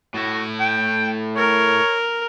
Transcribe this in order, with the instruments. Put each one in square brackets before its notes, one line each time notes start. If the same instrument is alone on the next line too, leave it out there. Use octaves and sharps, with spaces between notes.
[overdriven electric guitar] A2 E4 [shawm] F#4
[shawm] G5
[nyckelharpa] A#4 [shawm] C#5